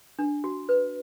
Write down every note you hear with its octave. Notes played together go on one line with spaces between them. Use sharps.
D4
F#4
B4